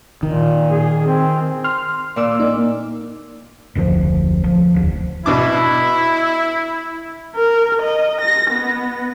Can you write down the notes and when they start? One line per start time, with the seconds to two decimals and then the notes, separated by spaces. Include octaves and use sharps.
0.23 A#2 D#3
0.71 G#4
1.06 C4
1.64 C6 F6
2.16 A#2 D5 E6
2.40 A#3 D#4
3.75 F1 D2 G#2 F3
4.44 F3
4.74 F1 D2
5.26 B2 D4 E4 D6
7.36 A#4
7.82 D#5
8.21 A#6
8.51 B3